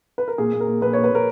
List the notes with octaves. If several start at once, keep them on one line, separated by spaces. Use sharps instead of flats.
B4
A#4
A#2 G#4
A#2
A#4
A#2
A#2 B4
C#5
A#2
B4
A#2 A#4